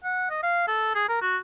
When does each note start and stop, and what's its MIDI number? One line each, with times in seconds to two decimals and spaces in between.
0.04 0.27 78
0.30 0.41 75
0.43 0.67 77
0.68 0.94 69
0.95 1.04 68
1.09 1.18 70
1.21 1.37 66